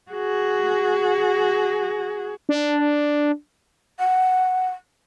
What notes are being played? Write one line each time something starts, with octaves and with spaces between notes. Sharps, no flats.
F#4 G#4
D4
F#5